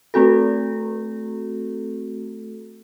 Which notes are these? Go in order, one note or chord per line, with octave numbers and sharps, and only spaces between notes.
A3 C4 F#4 A4